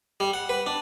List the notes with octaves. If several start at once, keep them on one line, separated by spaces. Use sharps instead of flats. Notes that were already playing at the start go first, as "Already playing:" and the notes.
G3
F#5
B4
D4